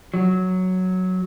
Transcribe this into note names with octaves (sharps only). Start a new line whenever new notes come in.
F#3